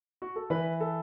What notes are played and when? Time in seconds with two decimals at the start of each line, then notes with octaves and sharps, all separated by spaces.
0.22 F#4
0.36 A4
0.50 E3 B4
0.81 A4